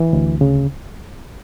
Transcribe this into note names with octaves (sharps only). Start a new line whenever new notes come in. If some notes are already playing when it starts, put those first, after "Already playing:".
Already playing: E3
D2
C#3